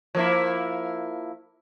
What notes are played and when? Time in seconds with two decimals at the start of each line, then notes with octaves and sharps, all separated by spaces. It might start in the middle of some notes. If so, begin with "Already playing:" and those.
0.15 F3 A#3 E4